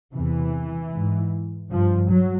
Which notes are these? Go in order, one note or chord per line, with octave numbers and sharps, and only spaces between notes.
E2 C3 E3
G#2
G2 F3
F#3